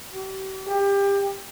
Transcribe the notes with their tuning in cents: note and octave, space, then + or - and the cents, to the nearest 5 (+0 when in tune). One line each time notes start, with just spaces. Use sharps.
G4 -40
G4 +25